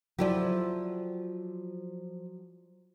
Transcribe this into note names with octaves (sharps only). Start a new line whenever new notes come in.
F3 F#3 E4 G4 A4 D5